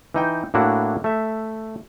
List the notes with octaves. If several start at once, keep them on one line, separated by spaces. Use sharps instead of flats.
E3 D#4 G5
A2 A#3 D4 E4 F#4
A3 E5